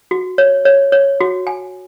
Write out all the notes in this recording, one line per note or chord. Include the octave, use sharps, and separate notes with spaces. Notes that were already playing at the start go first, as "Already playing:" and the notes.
F#4
C#5
C#5
C#5
F#4
G#5